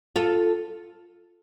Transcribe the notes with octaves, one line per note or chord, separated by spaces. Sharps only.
F4 A4